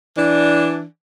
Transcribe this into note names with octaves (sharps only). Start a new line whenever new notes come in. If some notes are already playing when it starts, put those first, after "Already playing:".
E3 D4